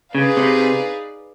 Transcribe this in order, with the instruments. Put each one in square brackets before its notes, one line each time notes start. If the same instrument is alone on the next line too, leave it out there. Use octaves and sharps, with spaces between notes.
[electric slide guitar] C#3 [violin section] D#4 G#4 B4 D5 F5
[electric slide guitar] C3